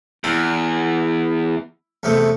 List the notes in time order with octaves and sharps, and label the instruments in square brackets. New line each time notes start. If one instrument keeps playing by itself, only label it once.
[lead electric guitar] E2 [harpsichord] E4
[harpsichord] E2 C3 A3